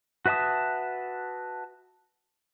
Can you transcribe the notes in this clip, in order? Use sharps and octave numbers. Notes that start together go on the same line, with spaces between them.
F#4 B4 E5 A5 D#6